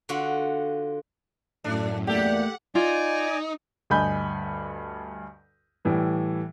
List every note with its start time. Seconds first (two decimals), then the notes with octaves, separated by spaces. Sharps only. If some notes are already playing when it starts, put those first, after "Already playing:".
0.09 D3 F4 F#4
1.64 F#2 A2 A3 D4
2.07 E2 A3 A#3 G4 A4 D5 F#5
2.75 D#4 F4 D5 G#5
3.90 D2 G2 D#5 G#5 B5 G6
5.85 A2 E3 G3